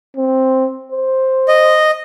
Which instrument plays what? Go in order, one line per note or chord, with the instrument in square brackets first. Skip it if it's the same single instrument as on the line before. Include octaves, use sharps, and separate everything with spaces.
[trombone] C4
C5
[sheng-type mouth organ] D#5